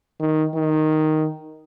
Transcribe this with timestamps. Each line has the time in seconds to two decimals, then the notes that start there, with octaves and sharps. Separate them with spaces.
0.20 D#3
0.55 D#3